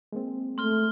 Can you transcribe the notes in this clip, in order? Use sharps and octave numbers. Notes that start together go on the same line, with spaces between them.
G#3 A#3 C4
A3 C6 F6 G7